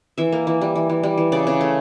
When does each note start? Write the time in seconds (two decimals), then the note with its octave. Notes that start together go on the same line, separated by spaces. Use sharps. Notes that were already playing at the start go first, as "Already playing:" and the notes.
0.18 E3 E5
0.32 A#3
0.47 E3
0.61 G3
0.75 E3
0.89 E3
1.03 G3
1.17 E3
1.32 C#3 D5
1.47 C#3
1.61 A3